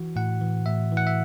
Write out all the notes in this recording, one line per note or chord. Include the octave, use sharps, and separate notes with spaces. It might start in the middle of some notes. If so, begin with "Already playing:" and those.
Already playing: E3 F#4
A2 F#5
E3
A2 E5
E3
F#5
E5